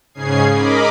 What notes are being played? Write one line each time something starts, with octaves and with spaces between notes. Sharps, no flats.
G#2 C#3 C#4 G#4 G#6 C7
A#4 D#5 B5 D6